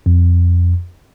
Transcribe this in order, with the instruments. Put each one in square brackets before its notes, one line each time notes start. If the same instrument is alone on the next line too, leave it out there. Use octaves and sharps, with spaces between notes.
[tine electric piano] F2